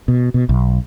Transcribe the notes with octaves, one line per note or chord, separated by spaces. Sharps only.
B2
B2
B1